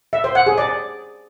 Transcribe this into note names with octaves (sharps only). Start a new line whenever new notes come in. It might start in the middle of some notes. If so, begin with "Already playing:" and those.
E5
C5
F#5
G#4
D5